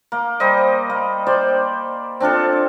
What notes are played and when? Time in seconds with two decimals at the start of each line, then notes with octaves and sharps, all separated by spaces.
0.12 A#3
0.40 G3 C5 D#5
0.90 A#3
1.27 C5 D5 G5
2.20 C4 D4 F4 A4